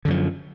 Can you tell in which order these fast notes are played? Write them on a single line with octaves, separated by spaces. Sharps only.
D3 F#2 F3